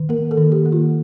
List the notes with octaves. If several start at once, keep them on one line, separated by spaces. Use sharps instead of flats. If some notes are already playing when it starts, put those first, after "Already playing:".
Already playing: D#3
A#3 A#4
A4
D#3
G4
A#3
F4